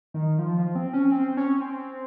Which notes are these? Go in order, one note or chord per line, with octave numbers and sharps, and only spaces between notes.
D#3
F3
F3
C4
C#4
C4
C#4
C4